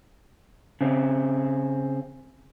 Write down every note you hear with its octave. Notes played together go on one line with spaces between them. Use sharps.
C#3 C4